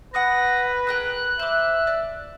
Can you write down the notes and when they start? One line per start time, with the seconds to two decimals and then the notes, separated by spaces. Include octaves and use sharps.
0.14 B4 F#5 D#6 F#6 A#6
0.87 G#4 A#4 G5 F#6
1.39 C5 E5 D6
1.87 D5